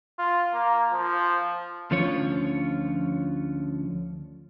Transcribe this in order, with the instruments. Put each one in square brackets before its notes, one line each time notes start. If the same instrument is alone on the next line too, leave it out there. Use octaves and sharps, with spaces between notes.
[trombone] F4
A#3
F3
[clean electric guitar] D2 D3 F3 C#4 F4 C#5